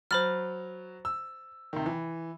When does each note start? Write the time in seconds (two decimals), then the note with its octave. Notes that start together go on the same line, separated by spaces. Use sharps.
0.11 F#3 C5 B5 F6 A6
1.05 E6
1.73 C3 D#3
1.86 E3